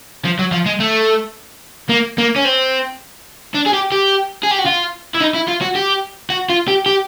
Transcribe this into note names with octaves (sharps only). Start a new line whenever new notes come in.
F3
F#3
F3
G#3
A3
A#3
A#3
C#4
C4
D4
G#4
G4
G4
G#4
G4
F#4
F4
E4
D#4
E4
F4
F#4
G4
F#4
F4
G4
G4